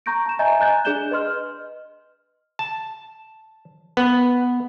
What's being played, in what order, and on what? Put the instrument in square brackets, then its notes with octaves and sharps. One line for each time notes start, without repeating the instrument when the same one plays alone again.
[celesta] A#5 C#6 G6 A#6 D7
A5 E7
D#5 E5 G#5 A#5 G6 A6
D#5 G#5 A#5 F#6 G6 A6
D4 G#4 D5 G6 E7 G7
B4 D#5 C6 F6
[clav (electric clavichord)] A5
B3